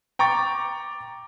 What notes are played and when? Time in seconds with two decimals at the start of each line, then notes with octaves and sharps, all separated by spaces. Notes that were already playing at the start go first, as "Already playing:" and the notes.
0.19 G5 A#5 C#6 D6 A6